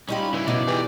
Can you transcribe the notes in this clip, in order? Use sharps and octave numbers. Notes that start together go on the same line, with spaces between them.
G3 C#4 D#4 F4 G4 B5
C#3 E3 E4
B2 B3 D#4 D5
E3 G4 G#4